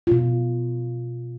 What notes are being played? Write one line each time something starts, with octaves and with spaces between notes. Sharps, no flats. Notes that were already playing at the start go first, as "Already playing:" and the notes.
B2 F4